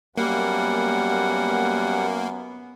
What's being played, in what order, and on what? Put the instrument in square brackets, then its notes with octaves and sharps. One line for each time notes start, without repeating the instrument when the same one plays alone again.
[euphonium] F#2 [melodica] G3 F#5 [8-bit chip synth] A#3 [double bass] B3